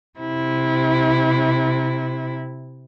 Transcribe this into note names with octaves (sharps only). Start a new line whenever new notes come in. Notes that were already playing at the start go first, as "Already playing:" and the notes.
C3 E4